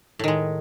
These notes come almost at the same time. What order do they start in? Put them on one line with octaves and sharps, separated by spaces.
A2 D#3 G#3